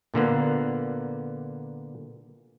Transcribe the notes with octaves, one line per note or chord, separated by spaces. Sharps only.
A#2 D3 A#3 B3